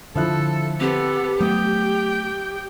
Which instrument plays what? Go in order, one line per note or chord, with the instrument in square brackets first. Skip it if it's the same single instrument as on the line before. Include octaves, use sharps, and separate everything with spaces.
[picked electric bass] D3 [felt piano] F3 E4 F#6 [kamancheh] A4
[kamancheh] B3 A4 [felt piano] C4 [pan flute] G4
[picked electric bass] F#3 A3 B3 [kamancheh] G5 [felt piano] D#6